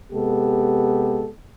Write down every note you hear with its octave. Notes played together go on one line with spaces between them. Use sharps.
C3 G#3 B3 G4 A4